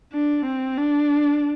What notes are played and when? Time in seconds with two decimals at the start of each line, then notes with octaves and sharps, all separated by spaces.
0.13 D4
0.45 C4
0.77 D4